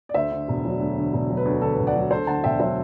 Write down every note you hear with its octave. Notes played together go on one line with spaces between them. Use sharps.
D5
D2 C5 E5
D3
E1
F#3
D2
D3
E1
F#3
B4
D2
D3 A4
B4
E1
D5 F#5
F#3
D2 A4 C5
D3 F#5 A5
E1 E5 G5
F#3 C5 E5